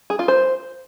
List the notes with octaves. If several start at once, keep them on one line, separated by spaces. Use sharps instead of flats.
G#4
F4
C5